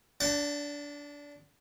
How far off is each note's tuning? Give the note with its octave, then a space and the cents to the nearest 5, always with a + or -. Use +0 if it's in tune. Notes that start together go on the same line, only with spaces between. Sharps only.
D4 -20 F#5 +45 A5 +25